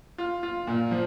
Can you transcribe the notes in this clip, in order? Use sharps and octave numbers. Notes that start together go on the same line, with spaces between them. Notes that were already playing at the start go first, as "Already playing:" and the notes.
F4
F4
A#2
F3